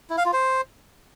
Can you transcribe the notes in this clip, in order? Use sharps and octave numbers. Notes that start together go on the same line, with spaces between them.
E4
F5
F4
C5